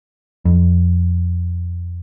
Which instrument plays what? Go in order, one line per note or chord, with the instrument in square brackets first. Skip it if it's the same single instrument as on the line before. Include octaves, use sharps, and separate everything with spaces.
[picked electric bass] F2